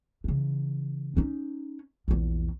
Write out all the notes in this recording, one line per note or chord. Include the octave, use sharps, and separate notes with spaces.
C#3 E3
C#4 D#4
A#1 E2